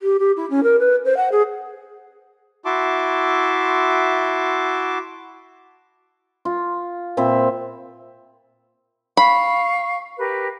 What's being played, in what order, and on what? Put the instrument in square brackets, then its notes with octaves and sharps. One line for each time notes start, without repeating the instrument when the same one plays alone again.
[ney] G4
G4
E4
C#4
A#4
B4
C5
F#5
G#4
[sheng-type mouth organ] E4 F#4 E5 A5 C6 D6
[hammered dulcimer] F4
A#2 C4 E5 B5
[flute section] F5 C#6 [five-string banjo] B5
[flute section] G4 A#4 B4